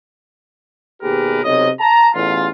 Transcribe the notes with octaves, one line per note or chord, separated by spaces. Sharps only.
D#2 B2 G4 G#4 A#4 B4
B1 C3 C#5 D#5
A5 A#5
A1 E2 F4